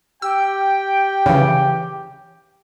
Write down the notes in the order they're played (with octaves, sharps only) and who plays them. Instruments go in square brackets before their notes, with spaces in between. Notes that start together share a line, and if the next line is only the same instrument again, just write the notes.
[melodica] G4 [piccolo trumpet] G5 [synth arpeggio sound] E6
[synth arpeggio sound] C#3 E3